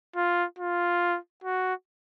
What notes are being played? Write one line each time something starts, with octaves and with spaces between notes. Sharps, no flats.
F4
F4
F#4